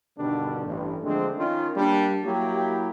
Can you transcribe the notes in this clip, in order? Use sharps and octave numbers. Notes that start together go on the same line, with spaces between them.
G2 B2 D3 D#3 G3 D4
A1 G2
D3 F3 G#3 A3 C4 D4
D#3 C#4 F4
G3 A#3 D4
F#3 A#3 E4 G4